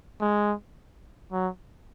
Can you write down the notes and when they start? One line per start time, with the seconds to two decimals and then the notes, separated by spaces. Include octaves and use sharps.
0.21 G#3
1.32 F#3